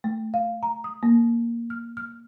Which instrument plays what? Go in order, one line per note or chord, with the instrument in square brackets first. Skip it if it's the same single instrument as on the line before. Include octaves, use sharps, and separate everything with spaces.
[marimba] A3
F5
A#5
D#6
A#3
F6
F6